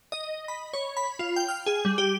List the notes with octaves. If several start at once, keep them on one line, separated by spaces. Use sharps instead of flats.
D#5
B5
C#5
B5
F4
G5
F6
G#4
G3
G4